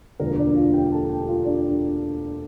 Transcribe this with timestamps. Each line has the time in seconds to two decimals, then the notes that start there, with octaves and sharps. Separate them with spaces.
0.20 E1 D2 D3 F3 A#3 A#4
0.38 D4 D5
0.56 F4 F5
0.74 G4 G5
0.92 A4 A5
1.09 G4 G5
1.28 F4 F5
1.45 D4 D5